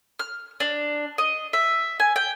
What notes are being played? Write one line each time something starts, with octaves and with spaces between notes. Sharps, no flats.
F6
D4
D#5
E5
G#5
G5